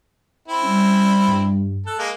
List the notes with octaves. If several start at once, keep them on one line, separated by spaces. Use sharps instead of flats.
C4 E4
G3 C#4
G2
A4 F#6
G#3 A#3